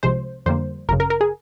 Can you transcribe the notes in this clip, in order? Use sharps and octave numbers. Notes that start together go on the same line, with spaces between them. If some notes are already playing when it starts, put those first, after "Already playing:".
C2 C3 F3 G#3 C5
F2 D3 G3 A#3 C5
G#1 F#2 C#3 A#4
A#4
A#4
G#4